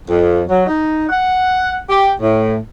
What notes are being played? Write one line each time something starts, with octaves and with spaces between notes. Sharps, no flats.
F2
F#3
D#4
F#5
G4
A2